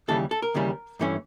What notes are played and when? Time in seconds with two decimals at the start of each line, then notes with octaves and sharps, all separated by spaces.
0.08 D#2 C#3 E3 G3 A4
0.31 A4
0.42 A#4
0.54 D#2 C#3 E3 G3
1.00 G2 E3 A3 C#4